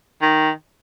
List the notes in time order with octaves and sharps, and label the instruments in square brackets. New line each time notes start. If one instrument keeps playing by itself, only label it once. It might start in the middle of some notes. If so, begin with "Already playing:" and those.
[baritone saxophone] D#3